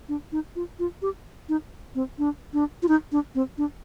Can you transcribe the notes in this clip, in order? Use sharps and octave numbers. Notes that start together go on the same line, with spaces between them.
D4
D#4
F4
F4
G4
D#4
C4
D4
D4
F4
D#4
D4
C4
D4